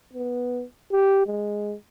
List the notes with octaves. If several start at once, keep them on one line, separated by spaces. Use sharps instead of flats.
B3
G4
G#3